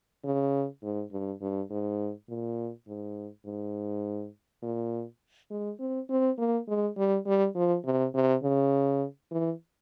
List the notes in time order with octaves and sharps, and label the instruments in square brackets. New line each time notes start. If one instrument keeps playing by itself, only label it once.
[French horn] C#3
G#2
G2
G2
G#2
A#2
G#2
G#2
A#2
G#3
C4
C4
A#3
G#3
G3
G3
F3
C3
C3
C#3
E3